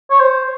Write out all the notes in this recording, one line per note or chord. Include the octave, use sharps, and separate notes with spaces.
C#5
C5